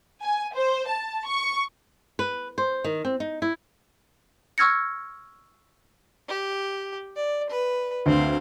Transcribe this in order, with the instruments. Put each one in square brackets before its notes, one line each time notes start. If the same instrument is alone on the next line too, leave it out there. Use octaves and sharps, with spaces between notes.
[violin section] G#5
C5
A5
C#6
[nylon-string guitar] B4
C5
D#3
C4
D#4
E4
[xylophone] C#6 E6 F6 G#6 A#6 C#7
[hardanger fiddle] G4
D5
B4
[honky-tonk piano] D2 [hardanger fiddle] C4 F5